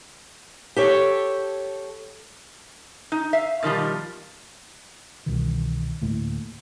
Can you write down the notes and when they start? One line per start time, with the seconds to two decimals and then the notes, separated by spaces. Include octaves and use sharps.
0.76 G4 A4 C#5
3.12 D#4
3.33 E5 F5
3.63 B2 D#3 F3 G3
5.26 C2 B2 D#3 E3
6.02 D2 A2 A3 A#3